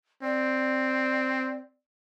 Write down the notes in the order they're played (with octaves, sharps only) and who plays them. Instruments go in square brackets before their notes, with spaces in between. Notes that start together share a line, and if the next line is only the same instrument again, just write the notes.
[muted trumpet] C4 [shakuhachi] D5